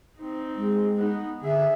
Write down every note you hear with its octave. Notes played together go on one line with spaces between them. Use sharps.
C4 D#4
G#3
B3 D#4
D3 G#4 E5